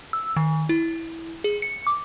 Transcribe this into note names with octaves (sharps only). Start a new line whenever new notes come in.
E6
D#3
E4
G#4
C#7
D6